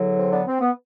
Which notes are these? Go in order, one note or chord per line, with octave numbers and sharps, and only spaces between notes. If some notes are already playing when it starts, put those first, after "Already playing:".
Already playing: E2 D3 F#3
C4
B3 D4
C4
B3